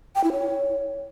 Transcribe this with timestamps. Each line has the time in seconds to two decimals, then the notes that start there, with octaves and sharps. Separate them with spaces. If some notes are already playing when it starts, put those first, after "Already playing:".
0.15 G5
0.24 E4
0.32 C#5